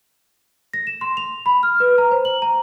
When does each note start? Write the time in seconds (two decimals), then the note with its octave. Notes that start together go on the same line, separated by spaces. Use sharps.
0.73 A#6
0.87 E7
1.01 C6
1.17 F7
1.46 B5
1.63 F6
1.80 B4
1.98 A#5
2.11 C5
2.25 F#7
2.42 A#5